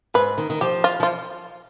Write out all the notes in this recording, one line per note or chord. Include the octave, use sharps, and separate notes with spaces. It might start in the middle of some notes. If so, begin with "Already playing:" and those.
G#2 B4
D#3
D#3
F3 G4
F4
F3 F4